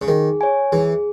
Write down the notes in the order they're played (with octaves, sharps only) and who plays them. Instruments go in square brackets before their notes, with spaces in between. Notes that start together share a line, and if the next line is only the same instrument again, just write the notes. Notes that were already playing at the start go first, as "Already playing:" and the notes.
[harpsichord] C#3
[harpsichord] D#3 [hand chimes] G#4
[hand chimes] C#5 G#5
[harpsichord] E3 [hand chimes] G#4